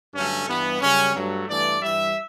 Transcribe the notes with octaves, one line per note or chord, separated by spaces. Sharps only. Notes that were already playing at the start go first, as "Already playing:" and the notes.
G2 D3 F#3 A3 C#4
G2 E3 G3 B3
F#2 C#3 G3 C#4
G2 F#3 A3
G2 E3 A3 D5
G2 E3 G3 E5